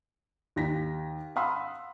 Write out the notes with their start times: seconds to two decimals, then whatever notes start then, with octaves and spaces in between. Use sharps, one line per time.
0.56 D#2 A#6 B6
1.36 F5 F#5 B5 C6 D#6 E6